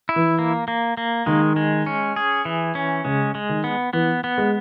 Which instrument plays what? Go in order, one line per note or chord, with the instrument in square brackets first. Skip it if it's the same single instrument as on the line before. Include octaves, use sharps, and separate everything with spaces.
[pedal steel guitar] E4
[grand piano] E3
[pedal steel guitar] A#3
A#3
A#3
[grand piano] D#3 [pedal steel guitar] G#3
[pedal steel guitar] G#3
C#4
G#4
E3
C#4
[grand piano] C#3 [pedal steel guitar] G#3
[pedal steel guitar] G#3
[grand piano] D#3
[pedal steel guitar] B3
[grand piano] E3 [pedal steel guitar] B3
[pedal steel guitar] B3
[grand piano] G#3